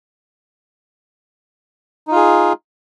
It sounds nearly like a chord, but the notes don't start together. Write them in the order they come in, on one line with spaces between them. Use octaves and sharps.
D#4 F4 G#4